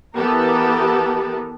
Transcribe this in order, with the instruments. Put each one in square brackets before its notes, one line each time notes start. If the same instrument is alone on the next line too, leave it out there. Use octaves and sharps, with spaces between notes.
[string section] E3 B3 G4 A4 A#4